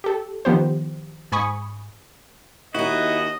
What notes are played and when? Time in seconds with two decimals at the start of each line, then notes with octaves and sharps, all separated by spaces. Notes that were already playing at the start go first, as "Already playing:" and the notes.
0.04 G4 A4
0.45 D#3 F3 B3 G4 C5
1.32 G#2 G#5 B5 C#6 D#6
2.75 D#2 D#4 E4 F#4 D#5